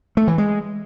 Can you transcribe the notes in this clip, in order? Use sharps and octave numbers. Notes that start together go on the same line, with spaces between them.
A3
E3
G#3